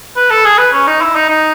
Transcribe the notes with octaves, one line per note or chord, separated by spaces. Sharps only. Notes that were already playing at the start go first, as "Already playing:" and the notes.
B4
A4
G#4
B4
C#4
D#4
E4
D#4
D#4